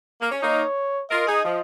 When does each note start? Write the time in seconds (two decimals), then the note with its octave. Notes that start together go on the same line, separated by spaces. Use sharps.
0.21 A#3
0.32 C#4
0.42 A#3 D#4 C#5
1.11 F4 A#4 D#5
1.28 D#4 G#4
1.45 F3